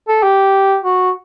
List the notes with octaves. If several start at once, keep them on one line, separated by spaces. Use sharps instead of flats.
A4
G4
F#4